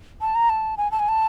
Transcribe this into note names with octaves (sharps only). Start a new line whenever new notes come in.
A5
A#5
A5
G#5
A5
G#5
A5